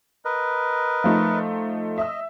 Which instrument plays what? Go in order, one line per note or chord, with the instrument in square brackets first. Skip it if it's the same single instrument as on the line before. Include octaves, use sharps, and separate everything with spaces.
[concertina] A#4 B4 D#5
[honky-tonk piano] F3 A3 D#4
[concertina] D#5 [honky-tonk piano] E5 E6